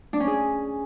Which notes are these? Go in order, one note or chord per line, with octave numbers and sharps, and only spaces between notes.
D4
C#4
G#4